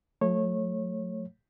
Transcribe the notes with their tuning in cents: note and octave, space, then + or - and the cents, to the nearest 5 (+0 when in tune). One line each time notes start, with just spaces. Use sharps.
F#3 -40 A3 +0 C#5 -20